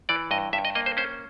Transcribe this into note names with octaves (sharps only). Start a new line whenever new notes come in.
E3 D5
G2 D#5
G2 E5
D#5
A#3 D#5
C5
C#4 C5